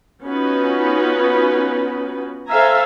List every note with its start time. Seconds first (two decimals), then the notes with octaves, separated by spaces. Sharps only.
0.23 B3 C#4 D#4 F4 F#4 B4
2.48 A4 C5 E5 F5 G#5 A#5